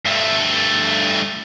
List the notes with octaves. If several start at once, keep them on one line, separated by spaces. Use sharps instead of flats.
G2 A3